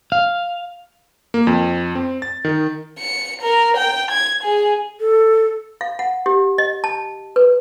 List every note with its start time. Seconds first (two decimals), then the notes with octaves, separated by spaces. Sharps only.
0.12 F5
1.34 A#3
1.47 F2
1.95 C4
2.22 A6
2.45 D#3
2.99 C#7
3.42 A#4
3.77 G5
4.11 G#6
4.43 G#4
5.00 A4
5.81 F5
5.99 F#5
6.26 G4
6.58 D#5
6.84 A5
7.36 B4